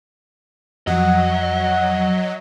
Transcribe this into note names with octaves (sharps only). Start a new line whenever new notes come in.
F2 F3 F#3 D#5 F#5